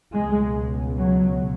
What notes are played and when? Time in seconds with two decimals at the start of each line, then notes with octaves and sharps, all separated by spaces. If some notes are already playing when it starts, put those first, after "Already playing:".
0.14 C#2 B2 G#3
0.98 F#3